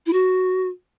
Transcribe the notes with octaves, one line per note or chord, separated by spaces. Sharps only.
E4
F#4